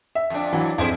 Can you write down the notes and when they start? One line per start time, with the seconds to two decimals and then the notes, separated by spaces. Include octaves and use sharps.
0.15 E5
0.30 F2 D4
0.53 E3 F#3
0.78 F2 E4 G#4 C5